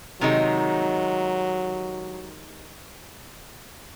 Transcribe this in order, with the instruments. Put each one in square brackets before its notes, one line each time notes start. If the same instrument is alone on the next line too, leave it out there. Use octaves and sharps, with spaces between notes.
[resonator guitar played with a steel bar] C3 D#3 G#3 D#4 [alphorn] F#3